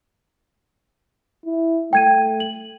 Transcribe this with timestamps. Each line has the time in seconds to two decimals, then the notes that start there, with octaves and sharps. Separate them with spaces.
1.46 E4
1.93 A3 G5 G#6 D#7
2.40 F#7